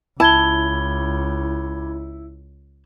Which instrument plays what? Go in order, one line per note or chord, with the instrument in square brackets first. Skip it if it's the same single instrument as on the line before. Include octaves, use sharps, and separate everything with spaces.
[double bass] C#2 [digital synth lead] E4 [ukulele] A5 [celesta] B5 G#6 G7